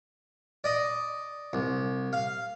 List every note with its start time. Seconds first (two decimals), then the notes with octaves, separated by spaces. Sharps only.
0.64 D5 D#5
1.53 C2
2.13 F5